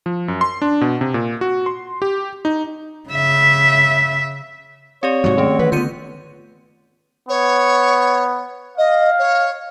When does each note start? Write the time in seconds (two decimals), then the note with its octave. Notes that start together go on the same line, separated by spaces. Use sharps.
0.06 F3
0.28 F#2
0.41 C6
0.62 D4
0.81 B2
1.01 C3
1.14 A#2
1.41 F#4
1.66 C6
2.02 G4
2.45 D#4
3.09 C#3 E5
5.03 C4 G4 C#5 D5
5.24 G#2 C3 F#3 F#4
5.37 D#3 A3 C4 C#4
5.59 E3 B4
5.72 D3 B3 F4 G6 C#7 D#7
7.28 B3 C#5
8.77 D#5 F5
9.18 C#5